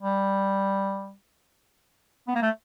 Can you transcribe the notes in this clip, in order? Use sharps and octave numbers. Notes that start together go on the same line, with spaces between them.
G3
B3
A#3
A3